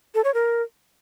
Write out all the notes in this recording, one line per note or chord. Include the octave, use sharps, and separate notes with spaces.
A4
C#5
A#4